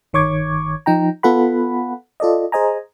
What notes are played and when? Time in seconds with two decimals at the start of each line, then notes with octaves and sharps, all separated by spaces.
0.13 G1 D#3 C#5 C#6 D6 G#6
0.86 F3 D#4 G5 A#5
1.23 B3 F4 A4 F#5 B5
2.20 F4 A4 D5 D#5
2.52 G#4 C5 D#5 G#5 A#5